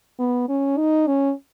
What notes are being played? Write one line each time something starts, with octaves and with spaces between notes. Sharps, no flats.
B3
C#4
D#4
C#4